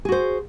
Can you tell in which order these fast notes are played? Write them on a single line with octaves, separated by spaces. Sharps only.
G#4 F#4 C5